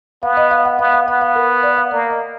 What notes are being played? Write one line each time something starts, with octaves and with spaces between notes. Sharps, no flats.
B3 F5
D#5
F5
F#5
B3 F5
F5
B3 F#5
F5
A#4
D5
F5
A#3 D5
D#5